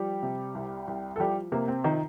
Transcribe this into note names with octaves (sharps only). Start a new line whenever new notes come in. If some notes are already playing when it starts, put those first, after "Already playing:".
Already playing: F3 G3 G4
C3
C2
C2
A4
F3 G3 G4
C3 A#3
C4
D#3 F3 D#4